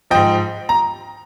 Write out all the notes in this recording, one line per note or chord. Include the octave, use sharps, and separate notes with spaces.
G#2 F3 D#5 G5
A#5